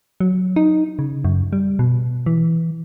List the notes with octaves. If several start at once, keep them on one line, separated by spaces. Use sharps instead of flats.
F#3
D#4
C#3
F#2
G3
B2
E3